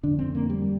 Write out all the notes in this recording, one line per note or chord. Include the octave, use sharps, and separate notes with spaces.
F2 D3 D4
C4
A#3
G3